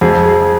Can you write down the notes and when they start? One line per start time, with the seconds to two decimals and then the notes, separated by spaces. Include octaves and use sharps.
0.01 F2 G#4
0.25 G#4